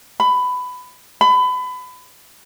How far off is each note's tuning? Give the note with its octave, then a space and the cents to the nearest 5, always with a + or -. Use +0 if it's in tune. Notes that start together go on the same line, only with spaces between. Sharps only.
B5 +15
B5 +25